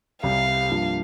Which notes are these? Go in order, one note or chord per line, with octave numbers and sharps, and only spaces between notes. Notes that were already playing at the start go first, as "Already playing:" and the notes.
C2 C3 G3 C4 G4 F5
G2 F3 A#3 D4 F4